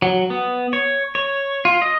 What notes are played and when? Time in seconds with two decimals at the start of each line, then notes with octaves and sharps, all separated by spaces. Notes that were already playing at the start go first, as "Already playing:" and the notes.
0.02 F#3
0.30 B3
0.73 C#5
1.15 C#5
1.65 F4
1.82 D#5